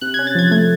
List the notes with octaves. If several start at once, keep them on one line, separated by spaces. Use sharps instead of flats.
C3 F#6
C#4 G#6
A6
F3 G#6
A3 G#6